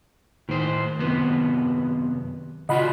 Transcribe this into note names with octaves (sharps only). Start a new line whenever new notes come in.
A2 D#3 C5
F#2 C3 B3
C#3 F4 F#4 D#5 F#5 B5